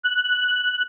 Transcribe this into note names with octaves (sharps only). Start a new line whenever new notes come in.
F#6